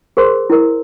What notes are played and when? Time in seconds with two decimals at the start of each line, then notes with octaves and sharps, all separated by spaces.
0.17 G#4 A#4 C5 C6
0.50 E4 A#4